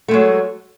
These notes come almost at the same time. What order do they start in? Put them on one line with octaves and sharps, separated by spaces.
A3 G#3 F#3